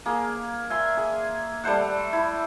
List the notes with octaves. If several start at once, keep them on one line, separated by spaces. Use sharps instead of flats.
A#3 G#4
E5 G#5 C6
G#4
G3 A3 C5 F#5
E4